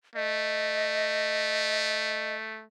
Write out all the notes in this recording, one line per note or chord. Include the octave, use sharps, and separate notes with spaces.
A3 D#5